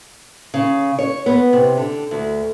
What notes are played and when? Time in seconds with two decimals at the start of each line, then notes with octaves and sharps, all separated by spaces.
0.54 C#3
0.99 C#5
1.26 B3
1.53 C3
1.77 D3
2.11 D2